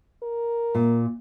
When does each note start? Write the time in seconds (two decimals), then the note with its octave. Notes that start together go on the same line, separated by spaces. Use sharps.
0.23 A#4
0.75 A#2